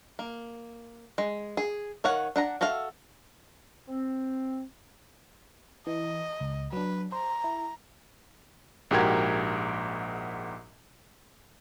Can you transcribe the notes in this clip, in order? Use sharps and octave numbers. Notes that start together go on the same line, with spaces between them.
A#3
G#3
G#4
D#3 C#5 F5 F#5
D4 F#5 A#5
F#4 A4 E5 F5
C4
E3 D#5
C#2
F#3 D4 B4
C5 A#5
E4
A#1 G#2 F#4 G4 A#4 G#6